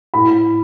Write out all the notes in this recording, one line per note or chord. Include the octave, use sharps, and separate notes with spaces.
A2 B5